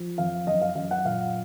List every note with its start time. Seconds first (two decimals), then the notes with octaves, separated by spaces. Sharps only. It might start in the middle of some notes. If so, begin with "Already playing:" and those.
Already playing: F3
0.18 F2 F5
0.47 F#2 D#5
0.61 F5
0.75 F#2 F5
0.91 F#5
1.05 A#2 F5